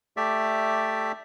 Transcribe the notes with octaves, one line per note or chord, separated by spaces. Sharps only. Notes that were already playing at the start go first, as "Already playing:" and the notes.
A3 G4 D5 E5